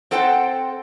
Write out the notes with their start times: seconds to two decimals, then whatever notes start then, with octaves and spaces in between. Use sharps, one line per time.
0.11 C4 A4 C5 F#5 G5